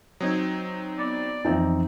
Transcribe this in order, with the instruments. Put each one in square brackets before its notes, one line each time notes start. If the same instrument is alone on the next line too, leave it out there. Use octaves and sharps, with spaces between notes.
[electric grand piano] F#3 C4 D#4 [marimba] D#6 G#6
[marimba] B3 [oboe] D5
[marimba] F2 E3 F3 [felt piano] C4 D#4